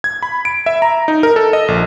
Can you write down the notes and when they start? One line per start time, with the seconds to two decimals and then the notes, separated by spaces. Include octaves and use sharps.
0.04 G#6
0.23 B5
0.45 D7
0.66 E5
0.82 A#5
1.08 D#4
1.23 A#4
1.36 A4
1.53 D#5
1.68 A#1